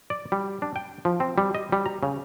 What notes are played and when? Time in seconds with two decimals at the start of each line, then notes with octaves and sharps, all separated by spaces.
0.10 D5
0.32 G3
0.62 D4
0.76 G5
1.05 F3
1.20 C4
1.38 G3
1.55 D#5
1.72 G3
1.86 A#5
2.03 C#3